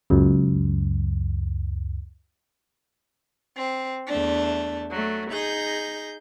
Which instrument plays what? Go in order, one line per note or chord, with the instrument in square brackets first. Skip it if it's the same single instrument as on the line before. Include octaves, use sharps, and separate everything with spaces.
[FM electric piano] C#2 F#2
[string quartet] C4
E2 A3 D4
F#3 A3
D#4 G#4 G6 A#6